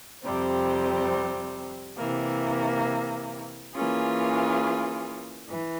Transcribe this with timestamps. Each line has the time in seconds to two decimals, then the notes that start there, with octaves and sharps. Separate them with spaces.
0.24 F2 C3 G3 C4
1.98 C3 E3 A#3
3.74 E3 A#3 C#4 F4 G#4
5.49 E3